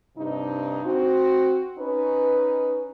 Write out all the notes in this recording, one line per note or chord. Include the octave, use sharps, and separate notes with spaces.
G2 C3 D4 D#4
C4 F#4
C#4 D#4 B4